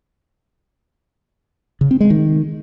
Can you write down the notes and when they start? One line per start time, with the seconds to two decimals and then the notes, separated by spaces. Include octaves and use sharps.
1.81 C#3
1.91 C4
2.01 G#3
2.10 D#3